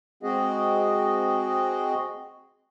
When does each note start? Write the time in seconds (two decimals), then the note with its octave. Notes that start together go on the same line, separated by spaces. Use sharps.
0.23 G#3 C4 F#4 G#4 D#5